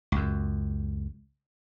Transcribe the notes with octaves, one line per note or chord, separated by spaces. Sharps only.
C#2 F#2